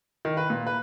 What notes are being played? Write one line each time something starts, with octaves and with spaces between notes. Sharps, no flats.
D#3
B4
A#2
B4